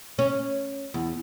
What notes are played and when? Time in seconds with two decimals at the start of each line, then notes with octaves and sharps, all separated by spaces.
0.19 C#4
0.94 E2